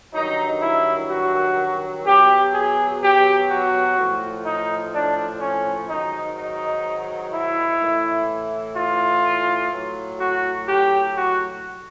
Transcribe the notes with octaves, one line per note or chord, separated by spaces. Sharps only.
G2 D#3 F#3 D#4
E4
F#4
B2 F#3 G4
G#4
G4
F#4
A2 F3
D#4
D4
C#4
G#2 D#3 F#3 D#4
D#4
E4
A2 E3
F4
A2 F#3
F#4
G4
F#4